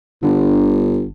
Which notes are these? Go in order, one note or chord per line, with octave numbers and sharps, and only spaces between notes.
G1 D3